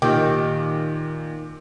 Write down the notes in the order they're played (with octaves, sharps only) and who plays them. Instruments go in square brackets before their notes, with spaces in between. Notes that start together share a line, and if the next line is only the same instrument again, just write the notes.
[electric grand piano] A#2 G4 D6 [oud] D#3 [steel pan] G5